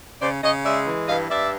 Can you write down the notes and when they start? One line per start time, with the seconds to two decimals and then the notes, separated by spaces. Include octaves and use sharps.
0.21 C#3 C5 D5
0.43 C#3 C#5 D#5
0.65 G#3 D5 E5
0.87 E3
1.08 G2 D#5 F5
1.30 G2 D5 E5